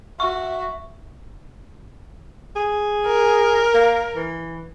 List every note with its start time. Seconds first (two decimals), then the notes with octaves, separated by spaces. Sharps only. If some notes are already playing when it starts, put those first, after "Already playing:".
0.20 F#4 E5 C#6
2.56 G#4
3.07 A#4
3.74 A#3
4.16 E3